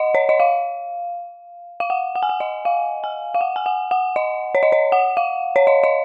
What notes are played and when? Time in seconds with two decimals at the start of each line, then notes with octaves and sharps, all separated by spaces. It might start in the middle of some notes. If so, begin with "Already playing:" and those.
Already playing: D#5 F#5
0.15 C#5
0.29 D#5
0.40 F5
1.80 F5
1.90 F#5
2.15 F#5
2.23 G#5
2.29 F#5
2.40 D#5
2.65 F5
3.04 G#5
3.34 F5
3.41 F#5
3.56 G#5
3.66 F#5
3.91 F#5
4.16 D#5
4.55 C#5
4.63 D#5
4.72 C#5
4.92 F#5
5.17 F5
5.56 C#5
5.67 D#5
5.84 D#5